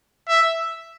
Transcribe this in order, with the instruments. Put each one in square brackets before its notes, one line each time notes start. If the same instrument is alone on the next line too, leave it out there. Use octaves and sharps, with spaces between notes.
[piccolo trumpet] E5